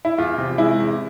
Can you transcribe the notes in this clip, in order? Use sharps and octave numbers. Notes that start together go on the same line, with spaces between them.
E4
E2 F4
C3
G#3 E4
E2